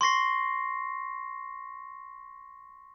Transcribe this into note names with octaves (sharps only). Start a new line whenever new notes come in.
C6 C#6 A#6 C7